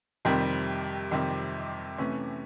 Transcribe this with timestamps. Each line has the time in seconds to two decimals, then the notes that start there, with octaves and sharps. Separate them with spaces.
0.25 F2 C3 D#3 G3 C4
1.11 F2 C3 D#3 G3 C4
1.98 C3 E3 A3 C#4